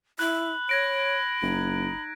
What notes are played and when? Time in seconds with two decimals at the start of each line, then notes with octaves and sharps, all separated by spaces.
0.19 E4 B5 F#6
0.69 C#5 G#6 A#6 D7
1.42 F#1 D#4